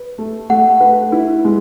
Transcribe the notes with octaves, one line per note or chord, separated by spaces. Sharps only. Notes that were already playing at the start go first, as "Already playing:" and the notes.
Already playing: B4
A3
A3 F#5
B4
E4
G#3